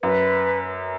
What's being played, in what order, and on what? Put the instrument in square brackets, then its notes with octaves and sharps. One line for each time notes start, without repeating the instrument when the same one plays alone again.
[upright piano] F#2 [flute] B4